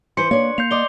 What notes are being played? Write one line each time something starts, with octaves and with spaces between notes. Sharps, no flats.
E3 B4 C5 C6 C#7
A#3 D4 C#5
A#3 G6 C7 F7
D5 D#5 C6 D6 G7